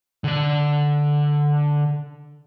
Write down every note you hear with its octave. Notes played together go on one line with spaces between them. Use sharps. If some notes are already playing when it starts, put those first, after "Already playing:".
D3 D5